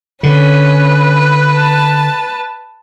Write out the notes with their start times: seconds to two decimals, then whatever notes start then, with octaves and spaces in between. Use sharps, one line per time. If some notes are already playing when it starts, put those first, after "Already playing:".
0.23 D3 C#4 B4
1.53 A5